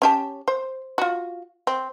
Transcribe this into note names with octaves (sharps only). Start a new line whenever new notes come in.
C#4 G4 A5
C5
F4 F#4
C4